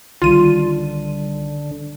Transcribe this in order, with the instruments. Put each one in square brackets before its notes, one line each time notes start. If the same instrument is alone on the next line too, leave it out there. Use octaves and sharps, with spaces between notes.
[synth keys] C2 D#3 G3 [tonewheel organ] D3 [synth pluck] F4 D#7